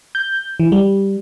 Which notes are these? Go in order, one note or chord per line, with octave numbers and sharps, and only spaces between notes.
G6
E3
G3